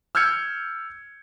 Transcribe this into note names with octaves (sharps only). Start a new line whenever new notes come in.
E6 F6 G6 G#6 C#7